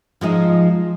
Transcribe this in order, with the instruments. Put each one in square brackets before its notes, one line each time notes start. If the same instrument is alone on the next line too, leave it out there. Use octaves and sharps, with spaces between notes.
[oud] F3 G#3 D#4